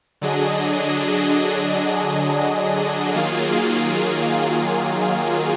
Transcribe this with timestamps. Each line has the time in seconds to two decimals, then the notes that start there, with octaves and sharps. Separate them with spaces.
0.21 D3 F#3 D4 G#4 D#5
3.14 D#3 F#3 A#3 F4 G#4